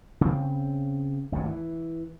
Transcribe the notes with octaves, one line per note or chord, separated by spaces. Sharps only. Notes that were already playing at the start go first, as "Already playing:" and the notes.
C#3 C4
G#1 D2 G2 A#2
E3